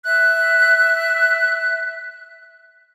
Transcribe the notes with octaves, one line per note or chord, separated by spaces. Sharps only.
E5 F#6